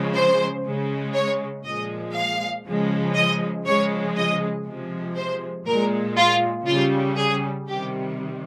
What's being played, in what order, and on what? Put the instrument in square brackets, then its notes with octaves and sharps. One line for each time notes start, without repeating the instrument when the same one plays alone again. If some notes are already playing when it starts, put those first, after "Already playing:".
Already playing: [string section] C#3 F3 G#3
C5
C#3 G#3
C#5
A#2 F3 G#3 D#5
F5
C#3 F3 G#3
D#5
C#3 F3 G#3 C#5
D#5
C3 F3 G#3
C5
A#2 G#3 A#4
F4
C#3 G3 F4
G#4
C3 D#3 G3 G4